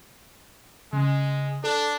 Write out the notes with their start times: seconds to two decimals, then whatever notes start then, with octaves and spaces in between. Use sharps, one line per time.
0.93 C#3 G#3
1.64 D4 A4